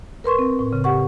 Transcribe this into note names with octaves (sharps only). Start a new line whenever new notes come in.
A#4 B4 C6 C#6
C4
A2
C#3
G4 F#5 C#6